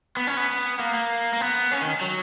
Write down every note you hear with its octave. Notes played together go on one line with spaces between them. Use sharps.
B3
C#4
B3
A#3
A#3
A#3
B3
C#4
D#3
F#3